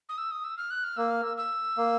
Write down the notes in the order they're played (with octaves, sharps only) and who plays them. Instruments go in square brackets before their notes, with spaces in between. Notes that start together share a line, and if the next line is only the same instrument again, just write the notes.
[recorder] D#6
E6
D#6
E6
F6
F#6
F6
[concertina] A#3 [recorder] E6
[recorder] F6
E6
E6
[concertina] A#3